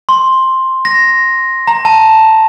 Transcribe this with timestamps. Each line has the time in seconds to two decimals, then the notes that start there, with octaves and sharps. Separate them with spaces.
0.09 C6
0.85 A#6
1.67 A#5
1.85 A5